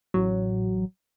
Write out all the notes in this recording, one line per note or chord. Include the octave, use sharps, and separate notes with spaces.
A1 F#3